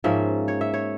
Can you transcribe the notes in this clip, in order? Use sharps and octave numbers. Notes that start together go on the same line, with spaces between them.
G#2 F3 A#3 C#4 E5
C#5
E5
C#5